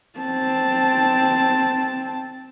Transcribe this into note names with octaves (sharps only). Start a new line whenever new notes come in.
C4 A5